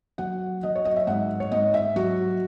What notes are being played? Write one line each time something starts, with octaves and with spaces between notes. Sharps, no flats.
F#3 F#5
F#3 D#5
C#5
D#5
E5
G#2 F#5
C#5
G#2 D#5
E5
F#3 F#4